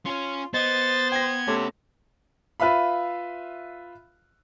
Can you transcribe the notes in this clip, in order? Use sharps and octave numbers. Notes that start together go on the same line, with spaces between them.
C#4 F4 C#5
B3 C5 D#5 A6
G5 C6 G#6 A#6
C3 A3 C#4 A4
F4 B4 E5 F5 B5